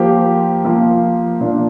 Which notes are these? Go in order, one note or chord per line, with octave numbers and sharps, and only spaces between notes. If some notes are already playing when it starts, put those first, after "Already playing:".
Already playing: F3 A#3 G4 C5
F3 A#3 F4
A#2 F3 A#3 D4